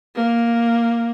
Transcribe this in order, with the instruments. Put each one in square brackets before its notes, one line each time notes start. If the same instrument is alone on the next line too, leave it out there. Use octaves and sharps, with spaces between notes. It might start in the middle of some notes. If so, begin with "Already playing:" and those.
[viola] A#3